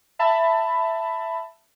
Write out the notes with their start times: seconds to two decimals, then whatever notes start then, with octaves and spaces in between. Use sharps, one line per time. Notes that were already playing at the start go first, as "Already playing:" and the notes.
0.19 E5 A5 B5